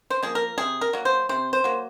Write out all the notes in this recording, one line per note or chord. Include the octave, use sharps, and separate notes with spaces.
C5
F3 A#3 G#4
A#4
C3 G#4
A#4
F#3 A#3
C5
C3 C5
C5
F#3 A#3